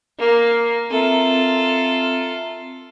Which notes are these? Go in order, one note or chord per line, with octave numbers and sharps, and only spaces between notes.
A#3
C4 F4 A4 E5 A#5